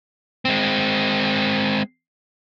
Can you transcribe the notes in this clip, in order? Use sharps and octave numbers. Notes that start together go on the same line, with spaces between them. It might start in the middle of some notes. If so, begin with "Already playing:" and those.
G#3 C4